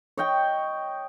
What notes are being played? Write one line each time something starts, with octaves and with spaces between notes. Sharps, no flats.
C#5 D#5 G5